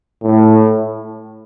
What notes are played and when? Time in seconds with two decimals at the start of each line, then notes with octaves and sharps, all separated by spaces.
0.23 A2